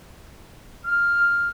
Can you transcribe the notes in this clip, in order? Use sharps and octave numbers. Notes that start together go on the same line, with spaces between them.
F6